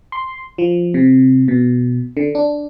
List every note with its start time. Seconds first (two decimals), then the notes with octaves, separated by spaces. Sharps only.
0.12 C6
0.58 F3
0.94 C3
1.48 B2
2.17 D3
2.35 D4